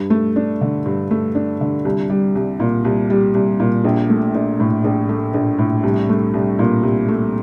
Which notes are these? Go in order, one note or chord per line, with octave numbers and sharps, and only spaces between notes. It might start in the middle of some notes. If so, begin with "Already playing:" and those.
Already playing: G2
A3
D4
D3
G2
A3
D4
D3
C2
G3
C2
A#2
C2
G3
C2
A#2
A#1
A3
A#1
A2
A#1
A3
A#1
A2
C2
A3
C2
A#2
C2
A3